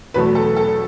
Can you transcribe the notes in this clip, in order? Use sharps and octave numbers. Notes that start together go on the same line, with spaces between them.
E2 B2 F#3 A3 B4
A4
A4